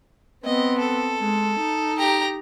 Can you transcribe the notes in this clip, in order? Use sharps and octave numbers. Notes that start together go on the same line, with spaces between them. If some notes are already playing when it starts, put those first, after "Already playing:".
B3 C4 D#5
A4
G#3
D#4
G4 A#5